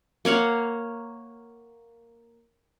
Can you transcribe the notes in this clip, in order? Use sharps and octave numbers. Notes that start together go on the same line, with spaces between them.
A#3 C#5 F5 F#5